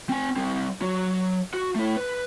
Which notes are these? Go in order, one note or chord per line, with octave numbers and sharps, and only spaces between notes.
C4 G#5
G3 C4
F#3 F#4
F#4
A3 E4
B4